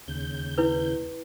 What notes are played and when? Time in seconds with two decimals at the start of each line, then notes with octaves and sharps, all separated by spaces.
0.08 D#2 C#3 G6
0.58 E4 B4